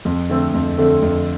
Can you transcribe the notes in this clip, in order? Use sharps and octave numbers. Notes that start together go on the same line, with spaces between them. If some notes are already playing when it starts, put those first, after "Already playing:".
F2
D3 A3 C4
F2
D3 A3 C4
F2